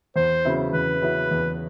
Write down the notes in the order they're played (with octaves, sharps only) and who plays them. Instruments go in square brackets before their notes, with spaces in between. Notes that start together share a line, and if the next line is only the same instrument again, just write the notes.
[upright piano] E2 [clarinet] C5
[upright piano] C#3 F#3 B3 E4
[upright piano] E2 [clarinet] B4
[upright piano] C#3 F#3 B3 E4
E2